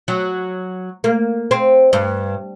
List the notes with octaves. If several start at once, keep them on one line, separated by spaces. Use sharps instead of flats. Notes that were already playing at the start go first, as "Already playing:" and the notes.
F#3
A#3
C4
G2